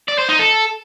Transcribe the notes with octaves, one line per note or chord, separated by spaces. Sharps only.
D5
C5
D#4
A4